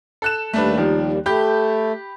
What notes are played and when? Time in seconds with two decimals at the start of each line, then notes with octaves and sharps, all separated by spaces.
0.22 A4 F#6 E7
0.53 D#2 G3 A3 D4 B4
0.78 D#3 F3
1.26 A3 G4 B5 G6